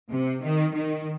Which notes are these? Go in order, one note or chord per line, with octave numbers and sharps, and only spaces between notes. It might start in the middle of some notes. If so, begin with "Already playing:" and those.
C3
D#3
D#3